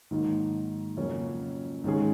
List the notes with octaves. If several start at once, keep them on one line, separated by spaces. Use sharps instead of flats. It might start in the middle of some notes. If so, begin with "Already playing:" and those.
G#2 D#3 F#3 A#3 D#4
F2 C#3 F#3 A#3 C#4
G#2 D#3 G#3 C#4 G#4